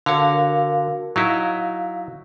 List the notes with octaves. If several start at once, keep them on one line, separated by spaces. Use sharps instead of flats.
D3 F#4 A#4 C#5 F5
F#3 D#4 E4 F5